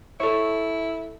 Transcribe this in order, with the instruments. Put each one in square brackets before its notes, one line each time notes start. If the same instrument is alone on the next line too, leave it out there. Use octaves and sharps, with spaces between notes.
[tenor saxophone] E4 [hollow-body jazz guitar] A4 C#5